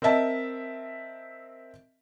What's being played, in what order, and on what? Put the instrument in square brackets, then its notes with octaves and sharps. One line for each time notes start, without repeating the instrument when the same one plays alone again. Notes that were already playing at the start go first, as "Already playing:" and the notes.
[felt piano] C4 A#4 D#5 E5 A5